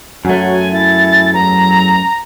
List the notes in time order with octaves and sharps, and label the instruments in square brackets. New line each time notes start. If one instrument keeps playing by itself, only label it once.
[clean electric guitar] F#2 A3 [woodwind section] F#3 C#5 [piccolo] G#5
[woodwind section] E4 G#5 [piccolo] A6
[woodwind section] E2 F#3 [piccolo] A#5